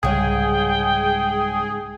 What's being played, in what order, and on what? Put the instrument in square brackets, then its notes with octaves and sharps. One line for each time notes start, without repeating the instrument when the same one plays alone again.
[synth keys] C2 G3 C#5 [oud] G#2 C#3 [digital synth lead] G#4 [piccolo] G5